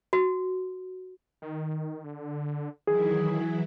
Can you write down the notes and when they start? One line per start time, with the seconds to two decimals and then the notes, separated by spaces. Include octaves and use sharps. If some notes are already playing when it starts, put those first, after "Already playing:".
0.13 F#4
1.42 D#3
2.04 D3
2.87 D#3 E3 F#3 E4 G#4